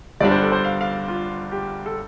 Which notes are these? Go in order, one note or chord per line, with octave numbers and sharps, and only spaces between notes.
G1 G2 G3 D4 D5
C5
A4
C5
F5
F5
F4
G4
A4